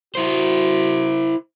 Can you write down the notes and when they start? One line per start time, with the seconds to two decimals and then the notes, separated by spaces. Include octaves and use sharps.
0.15 E4 F#4 C5